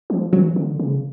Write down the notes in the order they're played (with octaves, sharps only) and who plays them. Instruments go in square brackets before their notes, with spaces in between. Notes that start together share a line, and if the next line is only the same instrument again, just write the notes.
[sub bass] F3
[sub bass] E3 [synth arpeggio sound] F#3
[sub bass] D3
C#3